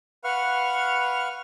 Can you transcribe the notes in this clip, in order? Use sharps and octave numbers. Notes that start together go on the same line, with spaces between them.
B4 F5 F#5 C#6 F6